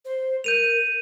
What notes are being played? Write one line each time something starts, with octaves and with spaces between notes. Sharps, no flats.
C5
A#4 G6 D#7 F7